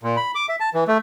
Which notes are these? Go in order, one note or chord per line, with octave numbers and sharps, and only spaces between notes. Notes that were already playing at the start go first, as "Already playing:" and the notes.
A#2
B5
D6
E5
A5
E3
A3